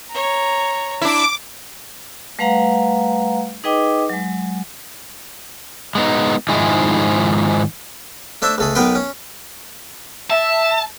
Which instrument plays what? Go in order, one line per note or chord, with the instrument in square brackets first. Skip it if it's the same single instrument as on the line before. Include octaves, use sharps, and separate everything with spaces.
[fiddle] C#5 [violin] A#5
[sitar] D4 E4 [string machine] D6
[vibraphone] G3 A3 B4 F5 F#5 A#5
D#4 G#4 B4 D#5 G5 D6
F#3 G#3
[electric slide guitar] G#3 B3 D#4
G#2 D#3 F3 G#3 E4 G#4
[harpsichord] A3 D4 C5 E5
C#2 A3 G#4
B1 B3 A#4 B4 G5 C6
C#4
[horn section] E5 [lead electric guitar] A5